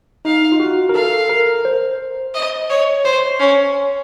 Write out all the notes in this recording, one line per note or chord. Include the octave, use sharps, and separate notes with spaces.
D#4 F5
F4
F#4
A#4
A4 F5
A#4
C5
D#5
C#5
C5 C#5
C#4